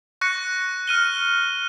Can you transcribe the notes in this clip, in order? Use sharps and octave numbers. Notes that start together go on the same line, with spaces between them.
C#6 F#6 A#6 C#7
F6 D#7 G7